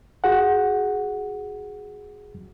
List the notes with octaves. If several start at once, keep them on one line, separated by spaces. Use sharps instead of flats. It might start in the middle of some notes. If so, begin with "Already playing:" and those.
F#4 G#4 F#5